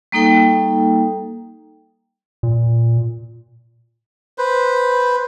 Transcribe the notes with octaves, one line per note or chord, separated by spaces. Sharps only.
G3 A#3 D#4 A4 G5
A#2
B4 C5